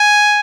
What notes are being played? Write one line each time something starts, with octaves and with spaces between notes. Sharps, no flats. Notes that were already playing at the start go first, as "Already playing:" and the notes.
Already playing: G#5